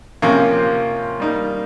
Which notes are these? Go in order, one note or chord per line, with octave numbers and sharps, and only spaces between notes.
C3 F3 A#3 C#4 F4
G3 A#3 D#4